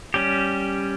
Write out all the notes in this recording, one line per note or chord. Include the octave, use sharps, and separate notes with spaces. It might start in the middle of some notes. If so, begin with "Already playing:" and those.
G3 C#4 G4